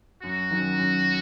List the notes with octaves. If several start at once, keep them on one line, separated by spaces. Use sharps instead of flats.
F#2 F#4
D#3 F#3 C#4
F#2